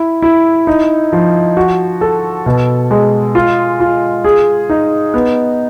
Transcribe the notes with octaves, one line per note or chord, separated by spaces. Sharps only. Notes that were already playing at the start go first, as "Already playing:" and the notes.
Already playing: E4
E4
D#4
F3
F#4
A4
B2
G#3
F4
F4
G#4
D#4
B3